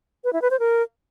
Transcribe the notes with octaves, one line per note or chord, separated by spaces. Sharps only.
B4
E4
B4
C5
A#4